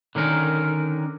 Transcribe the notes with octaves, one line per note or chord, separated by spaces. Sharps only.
D3 D#3 C#4 A#4